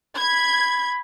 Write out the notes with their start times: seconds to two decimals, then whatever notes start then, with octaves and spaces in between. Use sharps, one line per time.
0.16 B5 G#6